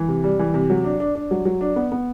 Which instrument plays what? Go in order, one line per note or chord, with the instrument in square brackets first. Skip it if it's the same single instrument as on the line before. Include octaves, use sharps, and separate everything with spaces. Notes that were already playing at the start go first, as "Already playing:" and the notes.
Already playing: [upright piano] E3
C3
G3
E3
C3
F#3
D4
D4
D4
F#3
F#3
D4
B3
B3